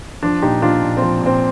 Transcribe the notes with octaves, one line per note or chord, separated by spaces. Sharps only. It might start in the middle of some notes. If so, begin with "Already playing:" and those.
F3 D4
A#2 D#4 G4
F3 D4 F4
A#2
C4
F3
A#2 C4